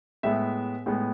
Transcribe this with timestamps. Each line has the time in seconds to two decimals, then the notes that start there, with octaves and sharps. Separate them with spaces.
0.23 A2 G#3 B3 E5
0.86 A2 G#3 B3